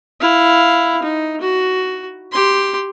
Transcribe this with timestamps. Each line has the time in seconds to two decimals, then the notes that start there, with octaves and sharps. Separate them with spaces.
0.21 E4 F5
1.03 D#4
1.41 F#4
2.32 G4 C6